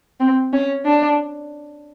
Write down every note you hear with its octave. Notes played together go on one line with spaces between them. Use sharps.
C4
C#4
D4